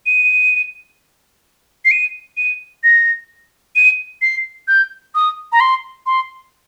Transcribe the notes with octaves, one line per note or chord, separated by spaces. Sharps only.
D#7
C7
D#7
D#7
A#6
D#7
C7
G6
D#6
A#5
C6
C6